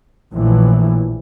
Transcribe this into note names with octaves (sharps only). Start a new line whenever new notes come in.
A#1 A2 E3